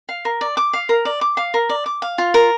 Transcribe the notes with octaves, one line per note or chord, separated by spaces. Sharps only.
F5
A#4
D5
D6
F5
A#4
D5
D6
F5
A#4
D5
D6
F5
F4
A#4